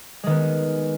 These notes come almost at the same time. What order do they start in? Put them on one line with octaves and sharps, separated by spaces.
G#3 D#3 B3